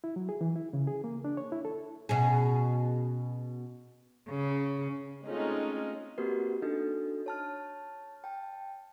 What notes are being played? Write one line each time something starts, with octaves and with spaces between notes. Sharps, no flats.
E4
F#3
G#4
E3
E4
C#3
G#4
A#3
D4
C#5
E4
A4
B2 C#4 G#4
C#3
G#3 A3 C4 C#4 D#4 F4
A#3 C4 F#4 G4 A#4 B4
D4 D#4 F#4 A4 D#5
C#5 A5 F6
G5 A5